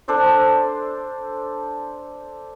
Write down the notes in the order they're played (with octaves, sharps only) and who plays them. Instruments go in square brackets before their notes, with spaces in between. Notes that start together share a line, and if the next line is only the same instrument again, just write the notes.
[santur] D4 A4 C5 D5